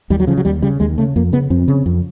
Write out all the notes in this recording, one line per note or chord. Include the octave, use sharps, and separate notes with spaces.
D#2 G3
F#3
C#3 F3
F#3
D#2 G3
C#3 G3
D#2 G#3
C#3 A3
F2 A#3
C#3 B3
F2 C4
C#3
F2